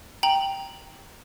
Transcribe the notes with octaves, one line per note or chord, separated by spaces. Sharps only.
G5 A#5 F#7